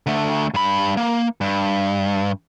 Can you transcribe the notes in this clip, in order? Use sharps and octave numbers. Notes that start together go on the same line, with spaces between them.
D3 A3
G2 B5
A#3
G2